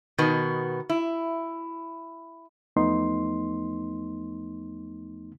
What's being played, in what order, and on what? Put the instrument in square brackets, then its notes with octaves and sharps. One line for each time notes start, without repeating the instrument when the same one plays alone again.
[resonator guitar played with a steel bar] B2 D#3 B3
E4
[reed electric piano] E2 F3 A3 B3 D#4 C6